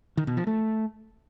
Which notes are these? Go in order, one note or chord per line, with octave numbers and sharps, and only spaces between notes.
D#3
B2
F3
A3